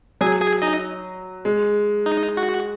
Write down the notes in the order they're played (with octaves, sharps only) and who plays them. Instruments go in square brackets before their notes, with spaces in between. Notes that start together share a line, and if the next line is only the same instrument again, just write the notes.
[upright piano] F#3 [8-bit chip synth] G#4 G#5
[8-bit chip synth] G#4 G#5
D#4 D#5
[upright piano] G#3
[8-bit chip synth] D#4
F#4